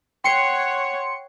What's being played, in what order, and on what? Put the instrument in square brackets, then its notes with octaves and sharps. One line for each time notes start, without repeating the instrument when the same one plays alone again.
[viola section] C#5 F#5 [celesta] G5 C7 [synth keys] C6 C#7